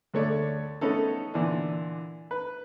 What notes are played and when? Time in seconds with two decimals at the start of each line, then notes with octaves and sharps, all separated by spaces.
0.14 D2 A3 C#5 D5
0.81 A3 B3 C#4 D#4 A4
1.34 A#2 D3 E3 D4
2.31 B4